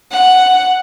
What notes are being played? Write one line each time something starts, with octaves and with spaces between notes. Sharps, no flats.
F#5